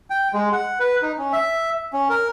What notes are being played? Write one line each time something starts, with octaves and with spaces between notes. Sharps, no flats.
G5
G#3
F#5
B4
D#4
C#4
E5
C#4
A#4